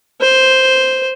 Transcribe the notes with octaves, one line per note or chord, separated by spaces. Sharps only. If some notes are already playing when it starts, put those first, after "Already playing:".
C5